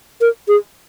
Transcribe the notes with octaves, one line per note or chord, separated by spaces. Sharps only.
A#4
G#4